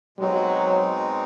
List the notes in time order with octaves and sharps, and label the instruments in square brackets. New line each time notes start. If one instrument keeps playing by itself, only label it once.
[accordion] B2 G#3 C4 D#4 [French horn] F#3